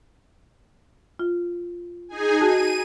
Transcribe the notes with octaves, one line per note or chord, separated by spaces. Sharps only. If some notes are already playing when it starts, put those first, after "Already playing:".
F4
D#4 G#4 G#5
F#4 G#4 A5 D#7